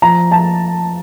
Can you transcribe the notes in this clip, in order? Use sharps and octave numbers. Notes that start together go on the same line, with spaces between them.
F3 A#5
F3 A5